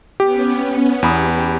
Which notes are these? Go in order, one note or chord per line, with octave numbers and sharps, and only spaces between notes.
B3 C#4 G4
E2 G4 B5 D#6